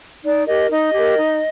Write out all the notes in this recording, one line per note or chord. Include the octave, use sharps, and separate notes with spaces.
D#4 D5
G4 A#4 D#5
D#4 D#5
G4 A#4
D#4